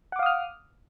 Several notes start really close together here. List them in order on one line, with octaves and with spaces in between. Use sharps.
F#5 D6 F5 D#6 F6